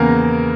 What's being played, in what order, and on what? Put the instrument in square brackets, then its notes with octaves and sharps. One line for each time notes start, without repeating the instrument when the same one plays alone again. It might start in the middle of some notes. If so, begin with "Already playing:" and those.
Already playing: [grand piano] E2 C#3 E3 A#3 A#4